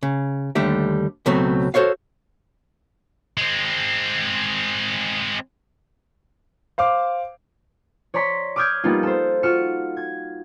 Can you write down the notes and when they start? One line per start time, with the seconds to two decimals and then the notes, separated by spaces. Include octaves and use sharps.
0.03 C#3
0.55 D#2 D3 G3 A3 G4 E5
1.26 C#2 B2 F#3 A3 C4
1.74 F#4 A4 C5 C#5 F5
3.38 G#3 C4
6.78 C5 F5 D6
8.14 C#5 D5 A#5 C6 B6
8.56 D6 D#6 F6 G6 G#6 D7
8.84 G3 A#3 B3 D#4 F4
9.03 A4 C5
9.43 F4 F#4 F6 C#7 E7
9.97 G#6